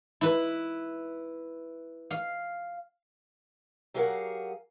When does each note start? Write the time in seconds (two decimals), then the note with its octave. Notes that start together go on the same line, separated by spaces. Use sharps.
0.21 E4 B4
2.11 F5
3.94 F#3 G4 G#4 A#4 F5 F#5